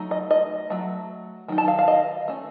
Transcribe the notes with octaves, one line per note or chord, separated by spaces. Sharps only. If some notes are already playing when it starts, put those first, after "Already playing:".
Already playing: F#3 A3 D#4
D#5
D#5
F#3 A3
D#3 F#3 D#4
A5
F5
F5
D#5
A3 C#4